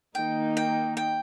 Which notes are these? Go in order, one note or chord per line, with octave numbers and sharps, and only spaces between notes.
D#3 A#3 D#4 G5
G5
G5